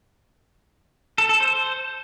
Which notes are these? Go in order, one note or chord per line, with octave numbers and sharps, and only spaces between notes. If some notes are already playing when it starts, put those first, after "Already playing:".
A4
A4
C5